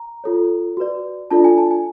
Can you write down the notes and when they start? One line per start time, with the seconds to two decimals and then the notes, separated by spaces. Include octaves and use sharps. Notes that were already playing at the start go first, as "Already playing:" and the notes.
Already playing: A#5
0.24 F4 A4 C#5
0.77 F#4 B4 D5
1.31 D4 F4 A4 D5 A5
1.44 G#5
1.58 A5
1.71 G#5